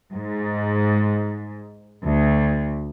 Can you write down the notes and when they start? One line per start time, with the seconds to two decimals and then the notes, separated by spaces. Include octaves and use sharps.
0.15 G#2
2.04 D2